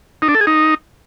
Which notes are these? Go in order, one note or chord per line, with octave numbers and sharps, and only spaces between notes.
D#4
D4
A4
G#4
D#4